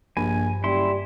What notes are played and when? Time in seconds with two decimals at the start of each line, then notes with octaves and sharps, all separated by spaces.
0.17 A#1 G2 G#5
0.64 F#1 G3 E4 C6